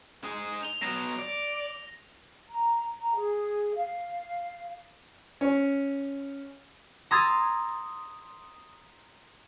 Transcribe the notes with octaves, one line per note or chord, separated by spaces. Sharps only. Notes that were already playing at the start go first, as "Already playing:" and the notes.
D#4 G#4
F7 G7
F#3 B3 A#6
D5
A#5
A#5
G#4
F5
C#4
A#5 C6 D#6 E6 G#6 A6